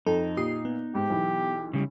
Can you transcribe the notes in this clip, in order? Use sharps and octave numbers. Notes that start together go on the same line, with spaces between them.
F2 D#4 A4
A#2 G4 D#6 C7
B3
G#2 G4
B1 E3
C#3 G3